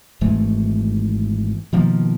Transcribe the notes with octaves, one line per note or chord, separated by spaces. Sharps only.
G#1 G#2 E3 A3
B2 D#3 F3 A#3